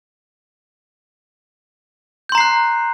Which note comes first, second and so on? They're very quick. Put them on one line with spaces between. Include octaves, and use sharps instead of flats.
G6 C6 A#5 C7 F#6